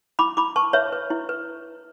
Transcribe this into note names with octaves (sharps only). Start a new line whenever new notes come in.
E4 B5 D6
E4 B5 D6
B4 A5 C#6
B4 C#5 E5
B4
E4
B4